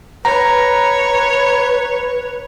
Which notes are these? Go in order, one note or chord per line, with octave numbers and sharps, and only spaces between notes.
B4 C#5 A#5